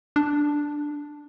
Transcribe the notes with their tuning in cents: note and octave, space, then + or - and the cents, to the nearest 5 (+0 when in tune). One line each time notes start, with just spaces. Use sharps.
D4 +0